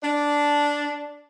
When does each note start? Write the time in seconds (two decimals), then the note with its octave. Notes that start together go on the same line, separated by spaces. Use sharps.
0.03 D4